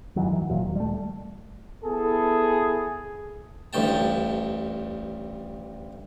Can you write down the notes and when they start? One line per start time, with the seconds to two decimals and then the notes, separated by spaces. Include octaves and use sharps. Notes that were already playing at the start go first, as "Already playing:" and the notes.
0.16 G2 D#3 E3 F#3
0.33 E3
0.49 E1 D#2 A#2 F#3
0.64 D#2
0.76 G3 A3
1.84 B3 E4 G#4 A4
3.73 A1 D2 G2 G5 A5